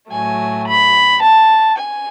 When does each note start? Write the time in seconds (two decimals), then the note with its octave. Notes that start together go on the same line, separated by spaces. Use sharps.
0.11 A2 F#3 A3 G#5
0.67 B5
1.22 A5
1.77 G#5